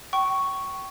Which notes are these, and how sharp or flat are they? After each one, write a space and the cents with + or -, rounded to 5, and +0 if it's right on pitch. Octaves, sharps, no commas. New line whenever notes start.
G5 -25 C#6 +0